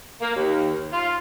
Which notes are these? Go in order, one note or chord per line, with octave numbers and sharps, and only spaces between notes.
A#3
D#2
F4